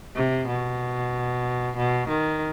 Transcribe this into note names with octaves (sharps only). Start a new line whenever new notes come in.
C3
B2
B2
D#3